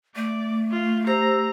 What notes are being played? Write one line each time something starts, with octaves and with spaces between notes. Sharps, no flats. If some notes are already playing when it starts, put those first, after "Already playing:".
A3 D5
F4
G4 C5 A#5 E6